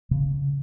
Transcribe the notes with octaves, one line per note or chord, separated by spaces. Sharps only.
C#3